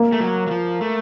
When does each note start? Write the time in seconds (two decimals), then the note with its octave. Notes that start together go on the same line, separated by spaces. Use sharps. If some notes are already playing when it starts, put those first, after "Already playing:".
Already playing: A#3
0.12 A3
0.20 F#3
0.47 F#3
0.51 F3
0.81 A3